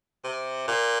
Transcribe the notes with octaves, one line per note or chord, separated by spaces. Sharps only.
C3
A#2